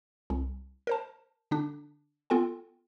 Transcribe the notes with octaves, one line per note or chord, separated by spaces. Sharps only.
C2
A#4 C5 A5
D3 D4
B3 F4 A4 G5 G#5